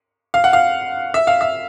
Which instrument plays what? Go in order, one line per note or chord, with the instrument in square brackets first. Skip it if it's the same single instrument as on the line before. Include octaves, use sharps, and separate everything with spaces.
[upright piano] F5
F#5
F5
E5
F5
E5